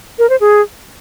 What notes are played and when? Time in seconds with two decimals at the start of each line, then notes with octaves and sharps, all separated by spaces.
0.19 A#4
0.30 C5
0.40 G#4